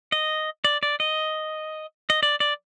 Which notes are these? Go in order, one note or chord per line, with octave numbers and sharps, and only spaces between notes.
D#5
D5
D5
D#5
D#5
D5
D5